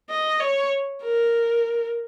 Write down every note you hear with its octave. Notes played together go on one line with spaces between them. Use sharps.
D#5
C#5
A#4